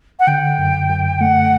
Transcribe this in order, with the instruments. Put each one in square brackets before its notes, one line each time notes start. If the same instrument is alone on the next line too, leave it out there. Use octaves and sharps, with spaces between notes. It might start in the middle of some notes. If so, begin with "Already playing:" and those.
[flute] F#5
[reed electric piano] D3 [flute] G5
[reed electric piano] F#2
F#2
[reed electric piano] A3 [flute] F#5